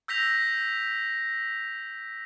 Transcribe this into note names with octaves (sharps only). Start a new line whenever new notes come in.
E6 G6 A#6 B6 F7